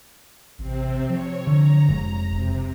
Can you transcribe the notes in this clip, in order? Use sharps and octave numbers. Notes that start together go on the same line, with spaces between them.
A1 C3 C4
F3 C#5
D3 A#5
F1 F2 G#3
E1 C3